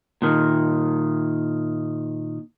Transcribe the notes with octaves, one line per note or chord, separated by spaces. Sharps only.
A#2 D#3